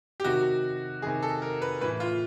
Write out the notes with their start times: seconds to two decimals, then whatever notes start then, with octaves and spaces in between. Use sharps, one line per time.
0.20 G4
0.24 C3 D#3 F#4
1.02 C3 D#3 G#4
1.22 A4
1.42 A#4
1.62 B4
1.81 A2 B4
1.84 E3
2.00 F4